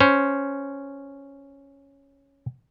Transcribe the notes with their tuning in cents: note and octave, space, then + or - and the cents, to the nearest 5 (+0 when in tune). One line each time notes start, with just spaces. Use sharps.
C#4 +0 C5 +0